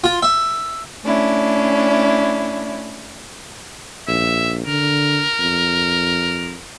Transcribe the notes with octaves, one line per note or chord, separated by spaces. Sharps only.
F4
E5
A3 C#4 D4 E4
A#1 E5
D3 A#4
F2